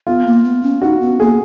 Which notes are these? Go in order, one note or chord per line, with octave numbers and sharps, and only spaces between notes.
B3 F4
A#3
B3
C#4
D#4 F#4
B3
A#3 G#4